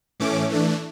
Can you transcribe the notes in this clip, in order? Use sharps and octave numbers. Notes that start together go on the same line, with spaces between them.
A2 E3 A3 C#4 D6
E3 A3 D4